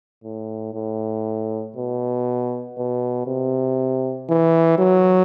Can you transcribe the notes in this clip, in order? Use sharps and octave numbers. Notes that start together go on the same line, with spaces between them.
A2
A2
B2
B2
C3
E3
F#3